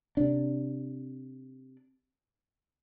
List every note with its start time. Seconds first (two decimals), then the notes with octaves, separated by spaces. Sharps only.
0.17 C3 D4